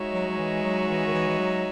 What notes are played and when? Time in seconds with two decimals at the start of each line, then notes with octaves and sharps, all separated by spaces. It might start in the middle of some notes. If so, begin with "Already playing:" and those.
Already playing: G#3 D#4 F#4 C#5 E5
0.13 F#3
0.28 F#3
0.38 E3
0.63 F#3
0.89 E3
1.06 D#3
1.14 E3
1.28 E3
1.39 F#3